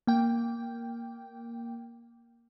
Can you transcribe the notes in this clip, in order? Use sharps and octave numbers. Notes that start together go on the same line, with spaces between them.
A#3 G5